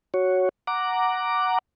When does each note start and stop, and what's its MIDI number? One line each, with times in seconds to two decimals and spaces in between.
0.14 0.49 66
0.14 0.49 73
0.67 1.59 78
0.67 1.59 82
0.67 1.59 86